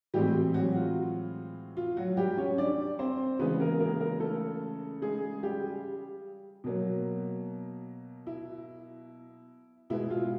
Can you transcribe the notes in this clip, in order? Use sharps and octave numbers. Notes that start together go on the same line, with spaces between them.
A2 E3 G3 G#3 C4 G4
F#3 F#4
F4
F4
F#3 F#4
G3 G4
C#4 C#5
D4 D5
C4 C5
C#3 E3 G#3 B3 B4
A#3 A#4
A#3 A#4
A#3 A#4
A3 A4
G#3 G#4
G3 G4
B2 F#3 A#3
E4
B2 G#3 B3 E4
F4